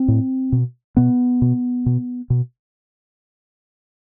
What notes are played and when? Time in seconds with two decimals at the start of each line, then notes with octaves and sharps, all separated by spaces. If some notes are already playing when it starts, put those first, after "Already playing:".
Already playing: C4
0.08 A2
0.52 B2
0.97 B2 B3
1.42 B2
1.86 B2
2.30 B2